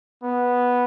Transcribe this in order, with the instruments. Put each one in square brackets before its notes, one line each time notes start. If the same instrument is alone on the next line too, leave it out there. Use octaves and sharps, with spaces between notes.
[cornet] B3